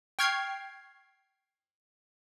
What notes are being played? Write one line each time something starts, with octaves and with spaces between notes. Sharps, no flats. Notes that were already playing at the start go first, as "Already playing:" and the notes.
G5 C#6 F6 G#6 C7